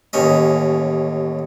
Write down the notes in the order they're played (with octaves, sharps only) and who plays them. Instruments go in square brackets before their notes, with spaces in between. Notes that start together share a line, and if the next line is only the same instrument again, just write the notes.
[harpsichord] A1 D#2 C#4 D#5